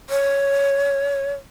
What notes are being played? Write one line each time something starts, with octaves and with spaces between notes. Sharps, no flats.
C#5